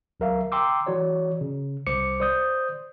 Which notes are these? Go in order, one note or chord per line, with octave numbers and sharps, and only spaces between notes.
C#2 F#3 A#4 E5 F5
G5 A#5 C6 D6 E6
E3 F#4 C#5 D5
C#3
C2 C5 D6 C#7
C5 D5 D#6 G6